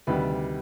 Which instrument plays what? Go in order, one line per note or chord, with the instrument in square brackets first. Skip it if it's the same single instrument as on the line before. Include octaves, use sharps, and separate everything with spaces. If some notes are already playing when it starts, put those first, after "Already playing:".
[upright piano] D2 C3 D#3 G3 B4